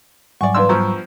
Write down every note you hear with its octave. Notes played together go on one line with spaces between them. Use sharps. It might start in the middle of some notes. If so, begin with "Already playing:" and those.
G#2 F#3 G3 D5 F#5 G#5 C#6
E2 D4 B4 F5 C6 E6
G2 F3 B3 A#5 C#6 E6